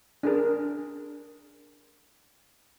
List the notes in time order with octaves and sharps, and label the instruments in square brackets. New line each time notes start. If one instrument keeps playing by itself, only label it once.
[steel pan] D4 G#4 A#4